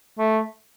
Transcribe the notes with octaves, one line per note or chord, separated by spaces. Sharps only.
A3